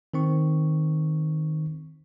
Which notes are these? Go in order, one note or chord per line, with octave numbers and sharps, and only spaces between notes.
D#3 C4 C#6